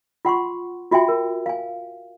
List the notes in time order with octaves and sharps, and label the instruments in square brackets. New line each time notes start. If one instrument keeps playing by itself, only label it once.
[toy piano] F4 F#5 C6 C#6
F4 F#4 E5 G5 G#5
A#4
F5 G#5